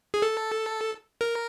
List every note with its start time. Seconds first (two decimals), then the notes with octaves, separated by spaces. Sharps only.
0.14 G#4
0.22 A4
1.21 A#4